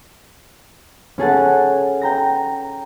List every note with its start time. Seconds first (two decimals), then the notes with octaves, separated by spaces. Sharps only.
1.18 C#4 G#4 A4 F#5
2.02 G5 A#5 A#6